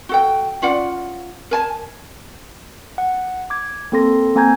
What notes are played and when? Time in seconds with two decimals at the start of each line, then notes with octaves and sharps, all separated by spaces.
0.09 F#4 A4 G5
0.62 C#4 F4 D5 F#5
1.51 A#4 G#5 A5
2.98 F#5
3.50 D6 G#6
3.92 A#3 C4 A4 C6 A#6
4.35 A#3 C4 G#5 A#5 G6 G#6